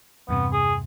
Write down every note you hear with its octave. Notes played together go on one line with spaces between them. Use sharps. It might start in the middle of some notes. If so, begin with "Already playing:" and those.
E2 G2 C3 B3
G#4